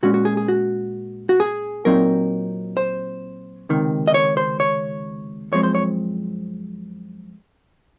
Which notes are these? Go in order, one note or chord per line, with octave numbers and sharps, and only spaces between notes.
A#2 G#3 C#4 F#4
F#4
G#4
G#4
F#4
F#4
G#4
A#2 F#3 C4 D#4 A#4
C5
C#2 C3 D#3
D#5
C#5
C5
C#5
F#2 F3 G#3 C4 C#5
C5
C#5